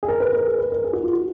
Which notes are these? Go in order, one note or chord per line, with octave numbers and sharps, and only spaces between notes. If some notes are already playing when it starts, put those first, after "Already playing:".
G#4
A#4
B4
A#4
G#4
B4
A#4
G#4
F#4
F4
F#4